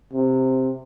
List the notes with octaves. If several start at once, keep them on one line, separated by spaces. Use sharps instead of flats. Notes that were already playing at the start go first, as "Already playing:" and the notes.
C3